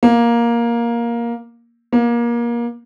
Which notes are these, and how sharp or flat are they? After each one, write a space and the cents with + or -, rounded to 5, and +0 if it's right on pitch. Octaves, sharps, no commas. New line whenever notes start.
A#3 +10
A#3 +25